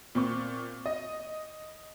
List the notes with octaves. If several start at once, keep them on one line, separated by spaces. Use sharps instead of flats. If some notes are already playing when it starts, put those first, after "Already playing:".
A#2 C4 C#6
D#5